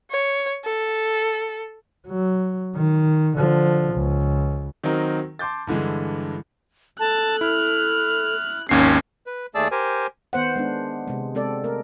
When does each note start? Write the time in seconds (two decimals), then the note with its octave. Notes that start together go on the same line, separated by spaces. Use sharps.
0.11 C#5
0.65 A4
2.08 F#3
2.75 D#3
3.37 D3 F3
3.94 C#2
4.84 D#3 F#3 C4 D#4 A#4
5.39 A5 C6 D6 G6 A6
5.67 G2 D3 E3 G#3
7.00 A4 A5 F#6
7.41 E4 F6
8.69 G#1 D#2 C#4 C7
9.26 B4
9.55 D#2 A3 G#4 D5 A5 E6
9.71 G4 A#4 C5 G#5
10.33 D#3 B3 C5 F#5
10.56 G#3 B3 D4
11.08 C3 G#3
11.35 G#3 C4 A4 D5
11.64 A3 A#4